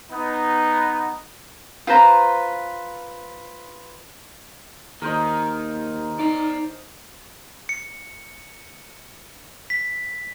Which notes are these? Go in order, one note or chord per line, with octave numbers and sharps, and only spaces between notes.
B3 D#4
F4 B4 C5 A#5
D#2 D#3 A#4 C5 D#5
D#4 D5 A#5
C#7
B6